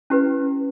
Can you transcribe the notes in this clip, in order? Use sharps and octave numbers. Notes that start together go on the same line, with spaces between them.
C#4 E4 G4 B4